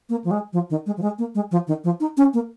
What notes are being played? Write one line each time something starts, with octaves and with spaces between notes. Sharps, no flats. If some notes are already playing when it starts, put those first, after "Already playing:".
A#3
F3
G#3
F3
D#3
G#3
F3
G#3
A#3
G#3
F3
D#3
F3
D#4
C#4
A#3